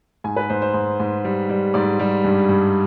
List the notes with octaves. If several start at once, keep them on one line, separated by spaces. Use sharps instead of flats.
G#2 G#5
B4
G#2 C5
C5
G#2
G#2
G3
G3
G#2 D5
G3
G2
G2